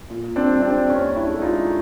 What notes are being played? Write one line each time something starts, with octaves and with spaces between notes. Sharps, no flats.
A#2
C4 D4
G3
C4 D4
D#2 C#4
D4 E4
G#3
D#4 F4